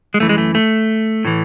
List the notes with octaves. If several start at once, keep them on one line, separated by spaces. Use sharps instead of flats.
G#3
F#2 E3 A3
G#3
A3
A3
A2 E3